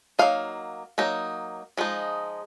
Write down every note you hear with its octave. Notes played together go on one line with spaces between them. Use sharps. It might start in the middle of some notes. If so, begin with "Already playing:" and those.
F#3 A#3 D#4 F5
F#3 A#3 D#4
F3 G#3 D#4